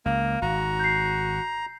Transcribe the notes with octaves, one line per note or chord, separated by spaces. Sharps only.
C#2 A#3 F5
G#1 F#4 A#5
G6 C7